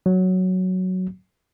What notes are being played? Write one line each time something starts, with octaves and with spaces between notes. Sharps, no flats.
F#3